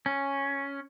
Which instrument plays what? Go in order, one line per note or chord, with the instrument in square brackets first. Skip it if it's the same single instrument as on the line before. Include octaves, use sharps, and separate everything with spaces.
[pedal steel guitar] C#4